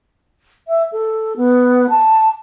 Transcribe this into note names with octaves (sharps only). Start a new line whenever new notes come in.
E5
A4
B3
A5